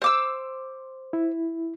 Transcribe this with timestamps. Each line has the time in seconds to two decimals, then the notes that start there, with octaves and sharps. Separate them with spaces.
0.02 C5 D6 E6
1.13 E4